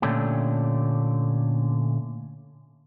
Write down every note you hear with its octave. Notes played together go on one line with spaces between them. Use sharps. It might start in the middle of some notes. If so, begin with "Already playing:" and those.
A#2 D3 A3 C#4 D4 G4